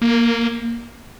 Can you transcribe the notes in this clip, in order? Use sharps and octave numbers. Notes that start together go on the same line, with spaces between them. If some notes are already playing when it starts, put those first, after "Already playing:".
A#3